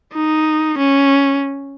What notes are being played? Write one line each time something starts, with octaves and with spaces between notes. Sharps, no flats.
D#4
C#4